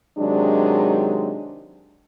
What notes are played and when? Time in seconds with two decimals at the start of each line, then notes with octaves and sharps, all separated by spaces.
0.18 C3 D#3 F#3 G#3 D4